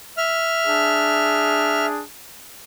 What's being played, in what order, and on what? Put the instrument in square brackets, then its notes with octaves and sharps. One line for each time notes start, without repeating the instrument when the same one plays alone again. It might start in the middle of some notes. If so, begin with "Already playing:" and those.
[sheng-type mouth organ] E5 F6
[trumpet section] D4 G#4